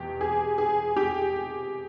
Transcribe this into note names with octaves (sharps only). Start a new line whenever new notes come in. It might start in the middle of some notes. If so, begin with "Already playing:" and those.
Already playing: E2 B2 G4
G#4
G#4
G4